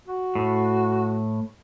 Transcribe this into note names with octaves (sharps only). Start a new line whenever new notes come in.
F#4
A2